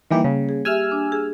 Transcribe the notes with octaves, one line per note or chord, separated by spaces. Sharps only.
D#3 E3 G3 A#3 G4
C#3
G#4
G4 E5 G#5 E6 F6
D4
G#4